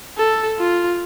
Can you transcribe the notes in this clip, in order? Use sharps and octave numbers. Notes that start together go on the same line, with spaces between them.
A4
F4